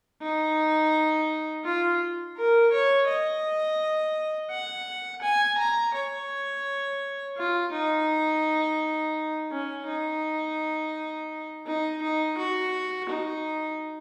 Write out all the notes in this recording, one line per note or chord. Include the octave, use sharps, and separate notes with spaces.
D#4
F4
A#4
C#5
D#5
F#5
G#5
A#5
C#5
F4
D#4
C#4
D#4
D#4
D#4
F#4
D#4